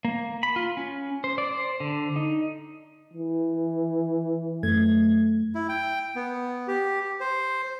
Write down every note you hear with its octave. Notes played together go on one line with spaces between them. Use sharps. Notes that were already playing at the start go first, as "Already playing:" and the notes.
A#3
B5
F4
C#4
C5
D5
C5
D3
D#4
E3
F#2 A3 G#6
E4
G5
B3
G4
C5